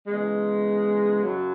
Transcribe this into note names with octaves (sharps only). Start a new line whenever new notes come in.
E2 C#3 G#3
F#2 C#3 F#3